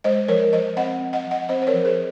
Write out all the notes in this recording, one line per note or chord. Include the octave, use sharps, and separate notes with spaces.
G#3 C5 D#5
F3 A#4 C#5
F3 C5 D#5
C4 D#5 F#5
C4
D#5 F#5
F3
D#5 F#5
C4 C5 D#5
C5
A#4 C#5
F3
G#4 C5